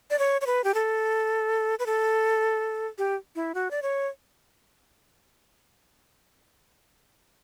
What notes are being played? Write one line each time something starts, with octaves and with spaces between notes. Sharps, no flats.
D5
C#5
C#5
B4
G4
A4
B4
A4
G4
E4
F#4
D5
C#5